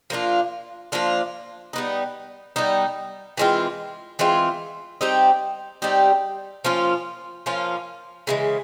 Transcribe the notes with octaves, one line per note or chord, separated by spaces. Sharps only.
F3 A#3 D4 F4
F3 A#3 D4 F4
G3 B3 D#4
G3 B3 D#4
E3 G#3 C4 F4
E3 G#3 C4 F4
G3 C4 D#4 G4
G3 C4 D#4 G4
F3 A#3 C#4 F4
F3 A#3 C#4 F4
C#3 E3 G#3